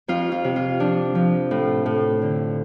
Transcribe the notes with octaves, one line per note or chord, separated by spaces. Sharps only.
F2 F4
F4
C3
F4
F3 D4
F3
A2
A2
D3